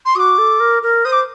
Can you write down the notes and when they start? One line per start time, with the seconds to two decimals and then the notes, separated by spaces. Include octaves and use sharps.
0.05 C6
0.15 F#4 D#6
0.19 D6
0.38 A4
0.60 A#4
0.83 A#4
1.05 C5 D#6
1.12 D6